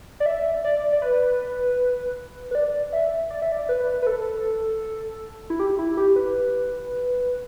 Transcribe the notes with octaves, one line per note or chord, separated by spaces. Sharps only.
D5
E5
D5
D5
B4
B4
D5
E5
D5
E5
D5
B4
B4
A4
E4
G4
E4
G4
B4